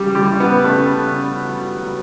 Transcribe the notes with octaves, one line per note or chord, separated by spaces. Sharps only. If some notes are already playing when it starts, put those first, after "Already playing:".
Already playing: C#3 G3 G4
G3 G4
C#3
B3 B4
C#3 A3 A4
C#3
F#3
F#3